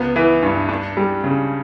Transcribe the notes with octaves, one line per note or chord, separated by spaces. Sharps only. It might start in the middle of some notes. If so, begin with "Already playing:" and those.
Already playing: C#2 B3
E3
G2
D4
G3
C#3